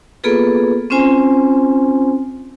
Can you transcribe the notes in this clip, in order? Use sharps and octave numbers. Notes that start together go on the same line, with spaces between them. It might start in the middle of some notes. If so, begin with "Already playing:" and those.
A#3 B3 F4 G#4 A4 B4
C4 C#4 F4 C5 G#5